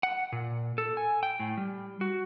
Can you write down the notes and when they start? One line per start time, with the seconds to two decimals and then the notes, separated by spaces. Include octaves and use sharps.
0.03 F#5
0.32 A#2
0.78 A4
0.97 G#5
1.23 G5
1.40 A2
1.57 G3
2.01 F#4